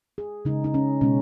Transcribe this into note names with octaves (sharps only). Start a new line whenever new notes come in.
G#4
C#3 G#3 D#4
D#4
C#4
B2 G#3 C#4